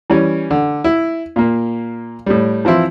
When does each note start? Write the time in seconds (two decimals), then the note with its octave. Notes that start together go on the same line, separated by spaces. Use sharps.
0.10 E3 G3 C#4
0.51 D3
0.84 E4
1.36 A#2 A#3
2.26 A2 G3
2.65 E3 F3 C4 E4